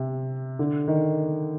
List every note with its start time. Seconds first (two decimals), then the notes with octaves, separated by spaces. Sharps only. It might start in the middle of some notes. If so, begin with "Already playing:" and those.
Already playing: C3
0.59 D3
0.88 D#3